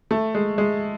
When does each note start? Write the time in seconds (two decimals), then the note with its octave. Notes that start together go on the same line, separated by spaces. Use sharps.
0.11 A3
0.35 G#3
0.58 G#3